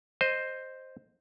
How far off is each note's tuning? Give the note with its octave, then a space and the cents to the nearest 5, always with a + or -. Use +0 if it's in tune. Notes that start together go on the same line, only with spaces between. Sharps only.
C5 +0 D#5 -10